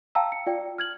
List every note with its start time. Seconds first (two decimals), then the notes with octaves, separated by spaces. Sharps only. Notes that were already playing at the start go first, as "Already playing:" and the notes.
0.15 F5 G5 A5 A#5 E6
0.32 C#7
0.46 F4 D5 G5
0.78 F6 G#6 F#7